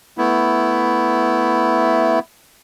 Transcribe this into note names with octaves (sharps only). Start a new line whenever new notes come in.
A3 B3 E4